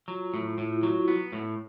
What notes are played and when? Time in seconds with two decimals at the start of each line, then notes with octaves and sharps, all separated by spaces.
0.08 F#3 F4
0.34 A2
0.58 A2 E4
0.70 F4
0.83 F#3 F#4
0.96 F#4
1.08 B3
1.32 A2